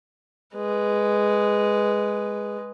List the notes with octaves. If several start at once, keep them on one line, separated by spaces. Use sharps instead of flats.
G#3 B4